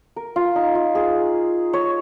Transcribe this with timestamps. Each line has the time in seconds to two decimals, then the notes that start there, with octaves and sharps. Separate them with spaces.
0.16 A#4
0.36 F4
0.56 D#4
0.75 F4
0.95 G#4
1.73 C#5